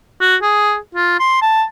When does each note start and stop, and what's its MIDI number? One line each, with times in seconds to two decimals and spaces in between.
0.21 0.36 66
0.42 0.76 68
0.95 1.19 65
1.20 1.40 84
1.42 1.64 81